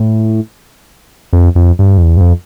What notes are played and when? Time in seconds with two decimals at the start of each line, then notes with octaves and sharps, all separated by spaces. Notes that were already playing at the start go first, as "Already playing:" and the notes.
Already playing: A2
1.33 F2
1.55 F2
1.79 G2
1.98 F2
2.03 E2
2.17 G2
2.21 F2